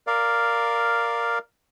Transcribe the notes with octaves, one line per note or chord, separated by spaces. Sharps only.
A#4 D5 F5